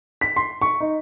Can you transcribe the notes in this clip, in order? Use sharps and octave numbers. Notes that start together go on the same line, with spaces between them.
B6
C6
C#6
D#4